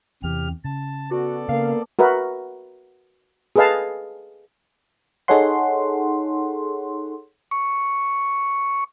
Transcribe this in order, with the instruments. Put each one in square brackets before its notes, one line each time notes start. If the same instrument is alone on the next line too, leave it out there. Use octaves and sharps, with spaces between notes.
[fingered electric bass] E2 E3 [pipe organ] C3 G4 F6
[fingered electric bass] C#3 [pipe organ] A5
[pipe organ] B3 A4 D5 [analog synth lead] F#4
[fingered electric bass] C#3 [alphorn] A#3 [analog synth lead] F5
[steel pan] F#4 A#4 B4 E5
G#4 A4 B4 D#5 F5 A5
[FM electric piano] D#4 G#4 A4 C#5 F#5 C6
[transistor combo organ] C#6